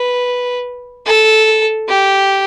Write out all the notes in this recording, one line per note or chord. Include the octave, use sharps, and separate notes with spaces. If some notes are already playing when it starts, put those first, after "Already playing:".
Already playing: B4
A4
G4